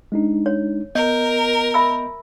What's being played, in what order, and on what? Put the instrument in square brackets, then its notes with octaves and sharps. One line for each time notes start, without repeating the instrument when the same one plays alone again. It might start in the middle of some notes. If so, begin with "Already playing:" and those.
[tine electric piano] G#3 D4 D#4
[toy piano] C#5
[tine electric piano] B3 D#5 G6 [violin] A#4
[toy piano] E5 B5 E6